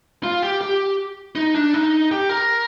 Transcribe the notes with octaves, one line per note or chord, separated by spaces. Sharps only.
F4
G4
G4
D#4
D4
D#4
G4
A#4